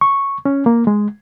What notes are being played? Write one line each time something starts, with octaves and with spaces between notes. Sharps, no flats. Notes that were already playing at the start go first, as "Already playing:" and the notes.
C#6
C#4
A#3
G#3